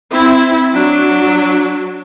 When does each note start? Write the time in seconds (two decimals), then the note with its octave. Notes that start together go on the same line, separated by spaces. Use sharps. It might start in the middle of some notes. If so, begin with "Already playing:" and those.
0.12 C4 E4
0.76 F#3 D4